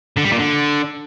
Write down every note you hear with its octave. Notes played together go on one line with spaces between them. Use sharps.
D3
G3
A#2
D3